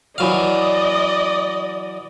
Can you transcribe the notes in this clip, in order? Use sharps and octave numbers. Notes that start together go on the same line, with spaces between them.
E3 F#3 D5 D#5 F5